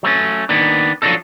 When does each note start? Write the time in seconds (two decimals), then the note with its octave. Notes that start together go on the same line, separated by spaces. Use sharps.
0.03 F#3 A3 C4 C#4
0.49 D#3 A#3 B3 D4
1.02 F3 F#3 A3 D4 D#4 A4